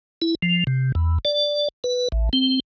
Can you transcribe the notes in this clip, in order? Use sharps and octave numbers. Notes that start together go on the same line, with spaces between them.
E4
F3
C3
E2
D5
B4
A1
C4